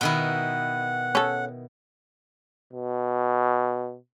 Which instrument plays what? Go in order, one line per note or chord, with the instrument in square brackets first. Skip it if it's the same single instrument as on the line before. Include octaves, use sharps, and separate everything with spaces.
[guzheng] B2 D#3 E4 [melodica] F#5
[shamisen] C#4 A4
[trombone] B2